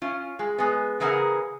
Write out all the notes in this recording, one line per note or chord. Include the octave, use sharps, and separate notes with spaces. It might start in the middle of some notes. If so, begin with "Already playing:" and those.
C#4 F4
G#3
G#3 B3
C#3 E3 A#3 G#4 A#4 F#5